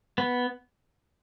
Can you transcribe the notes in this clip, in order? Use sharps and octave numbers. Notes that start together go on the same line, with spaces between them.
B3